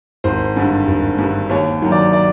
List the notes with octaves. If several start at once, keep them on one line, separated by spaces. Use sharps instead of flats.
G#1 C5
G2 D3
G#1
G2 D3
D#2 C#5
D#3 F#3
D5
D5